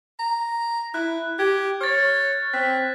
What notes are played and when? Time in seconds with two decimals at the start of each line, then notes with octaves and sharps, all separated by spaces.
0.19 A#5
0.94 E4 F#6
1.39 G4 G#6
1.81 C#5 F6 A6
2.53 C4 F#6 A6 B6